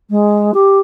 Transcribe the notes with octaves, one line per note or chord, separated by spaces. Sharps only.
G#3
G4